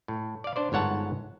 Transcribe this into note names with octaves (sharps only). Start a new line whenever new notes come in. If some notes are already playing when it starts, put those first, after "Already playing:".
A2
D5 F5
D4 C5 D5
G1 G#2 C#5 F#5 A5